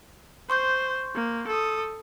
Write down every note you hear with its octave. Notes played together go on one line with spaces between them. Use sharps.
C5 C6 C#6 G6
A#3
A4 D#6